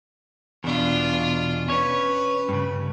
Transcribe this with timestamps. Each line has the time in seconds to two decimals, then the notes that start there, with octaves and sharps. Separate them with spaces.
0.64 E2 B2 D4 F4
1.68 C#4 B4 C#5
2.49 G2 C#3